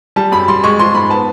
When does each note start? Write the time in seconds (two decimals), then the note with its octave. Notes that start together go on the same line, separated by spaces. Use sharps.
0.16 G3 A5
0.32 F#2 B5
0.48 G3 C6
0.64 G#3 C#6
0.79 F3 C6
0.94 G#2 B5
1.10 B3 A5